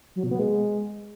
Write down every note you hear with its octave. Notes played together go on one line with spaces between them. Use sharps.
F#3
B2
B3
G#3